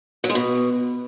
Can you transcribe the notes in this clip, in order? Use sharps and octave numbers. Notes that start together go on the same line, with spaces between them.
F#3
G#3
B2